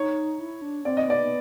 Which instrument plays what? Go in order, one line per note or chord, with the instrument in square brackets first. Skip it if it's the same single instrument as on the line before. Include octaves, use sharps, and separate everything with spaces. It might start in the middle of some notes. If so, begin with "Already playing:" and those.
Already playing: [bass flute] D#4 [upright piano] C#5
[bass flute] E4
D4
[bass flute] C4 [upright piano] D5
[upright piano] D#5
[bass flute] B3 [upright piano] D5